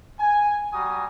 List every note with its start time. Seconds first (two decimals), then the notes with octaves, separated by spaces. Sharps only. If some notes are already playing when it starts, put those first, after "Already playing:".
0.19 G#5
0.72 G3 F#4 G#5 A#5 D#6